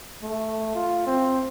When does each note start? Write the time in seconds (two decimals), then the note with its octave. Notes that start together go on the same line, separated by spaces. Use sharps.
0.22 A3
0.75 F4
1.06 C4